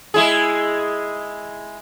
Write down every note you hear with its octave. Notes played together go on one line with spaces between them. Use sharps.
G#3 E4 G#4